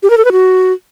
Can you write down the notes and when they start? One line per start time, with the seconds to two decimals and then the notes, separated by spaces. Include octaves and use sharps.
0.03 G4
0.10 A#4
0.17 A4
0.25 B4
0.32 F#4